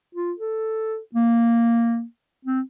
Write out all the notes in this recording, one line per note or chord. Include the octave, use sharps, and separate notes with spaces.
F4
A4
A#3
C4